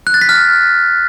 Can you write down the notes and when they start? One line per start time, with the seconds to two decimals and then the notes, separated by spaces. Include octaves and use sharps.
0.07 F#6
0.14 A6
0.21 B6
0.29 F6